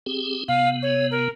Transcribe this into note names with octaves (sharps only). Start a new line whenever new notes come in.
C4 G4 G#4
C3 B3 F5
C#5
A#4